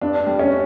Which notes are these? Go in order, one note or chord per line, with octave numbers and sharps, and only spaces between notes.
G2 D4
G3
C#4